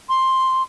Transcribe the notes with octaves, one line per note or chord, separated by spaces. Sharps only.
C6